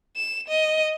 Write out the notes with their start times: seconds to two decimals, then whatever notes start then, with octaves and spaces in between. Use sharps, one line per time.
0.17 E7
0.48 D#5